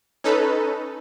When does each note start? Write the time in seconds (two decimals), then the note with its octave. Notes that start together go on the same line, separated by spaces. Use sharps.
0.24 C#4 D#4 A4 B4